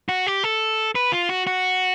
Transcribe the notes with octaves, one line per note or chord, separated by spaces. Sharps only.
F#4
G4
A4
B4
F4
F#4
F#4